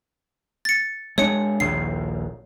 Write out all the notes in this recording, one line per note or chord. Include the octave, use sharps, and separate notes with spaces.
A6 C#7
G#3 B3 D4 C#5 C#7
A#1 D#2 C7